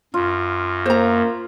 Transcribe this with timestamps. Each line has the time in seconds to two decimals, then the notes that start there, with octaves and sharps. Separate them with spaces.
0.14 F#2 F4
0.86 A#3 C5 A#5